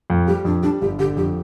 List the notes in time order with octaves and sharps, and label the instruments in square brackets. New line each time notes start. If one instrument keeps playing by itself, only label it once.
[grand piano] F2
[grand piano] G3 [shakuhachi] G4
[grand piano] F2 [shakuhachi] D4
[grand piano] G3 [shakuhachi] D4
[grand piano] G1 [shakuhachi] G4
[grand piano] D3 [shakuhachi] G4
[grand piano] F2 [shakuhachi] G4